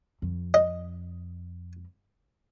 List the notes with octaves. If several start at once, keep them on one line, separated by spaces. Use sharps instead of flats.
F2
D#5